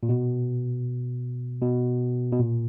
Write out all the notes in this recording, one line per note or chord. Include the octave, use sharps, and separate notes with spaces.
A#2
B2
B2
B2
A#2